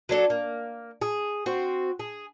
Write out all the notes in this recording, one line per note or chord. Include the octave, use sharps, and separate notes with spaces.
F#3 D4 A4
A#3
G#4
C4 F#4
G#4